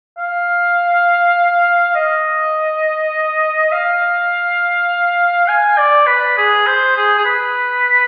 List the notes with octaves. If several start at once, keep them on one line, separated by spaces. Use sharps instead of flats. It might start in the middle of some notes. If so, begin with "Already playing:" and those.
F5
D#5
F5
G#5
D5
B4
G#4
C5
G#4
G#4
B4